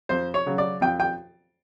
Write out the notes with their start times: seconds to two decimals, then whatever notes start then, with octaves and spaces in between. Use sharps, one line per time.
0.09 F2 C5
0.34 C#5
0.46 C#3 F#3
0.58 D5
0.81 F2 G5
1.00 G5